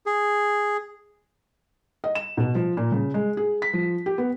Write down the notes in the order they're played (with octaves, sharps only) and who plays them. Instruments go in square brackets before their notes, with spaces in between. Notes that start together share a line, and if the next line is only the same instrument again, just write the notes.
[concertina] G#4
[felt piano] D#5
E7
B2
F3
A#2
C#3
G#3
G#4
B6
F3
G4
B3